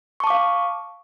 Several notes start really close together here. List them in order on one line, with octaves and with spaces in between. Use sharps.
C#6 A5 D6 F5